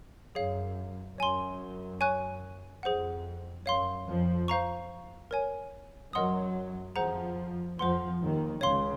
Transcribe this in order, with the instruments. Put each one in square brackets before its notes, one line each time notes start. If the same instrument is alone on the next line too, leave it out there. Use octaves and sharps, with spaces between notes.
[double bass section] F#2 [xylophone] G#4 C#5 F5
[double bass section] F#2 [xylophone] C#5 G#5 C6
[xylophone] C#5 G#5 C#6 F#6
[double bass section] F2 [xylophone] G#4 C5 F#5
[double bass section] F#2 [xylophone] C#5 F5 C6
[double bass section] F2 F3
[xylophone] C5 F5 A#5 C#6
A#4 C#5 G#5
[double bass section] F#2 F#3 [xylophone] A#4 D#5 F#5 C6 D#6
[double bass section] F2 F3 [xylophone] G#4 C5 F#5 A#5
[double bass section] F2 F3 [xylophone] C5 F#5 C6
[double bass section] D#2 D#3
[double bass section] C#2 C#3 [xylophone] C#5 F5 C6